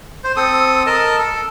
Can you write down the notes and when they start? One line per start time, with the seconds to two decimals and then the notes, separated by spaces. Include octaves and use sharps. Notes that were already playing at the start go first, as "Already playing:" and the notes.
0.24 C5
0.36 C4 A4 D#6
0.86 A#4 D#5 A5
1.19 A4